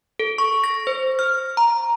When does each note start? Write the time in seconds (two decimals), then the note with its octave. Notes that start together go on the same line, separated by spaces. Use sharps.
0.20 A4
0.38 C#6
0.64 A#6
0.87 C5
1.19 F6
1.57 A#5